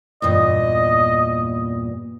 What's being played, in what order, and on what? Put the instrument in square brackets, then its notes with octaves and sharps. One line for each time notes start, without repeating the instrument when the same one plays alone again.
[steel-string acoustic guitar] E2 G2 A#2 [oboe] D#5